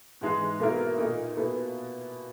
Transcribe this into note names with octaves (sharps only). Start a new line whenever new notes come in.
G#2 E3 G#3 D#4 G#4
B2 A#3 E4 A#4
A#2 A#3 D#4
B2 A#3 E4 B4